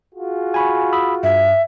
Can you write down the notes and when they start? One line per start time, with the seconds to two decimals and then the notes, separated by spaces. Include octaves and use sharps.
0.15 F4 F#4 G#4
0.54 G#5 B5 C#6
0.93 B5 D#6 E6
1.23 G2 E5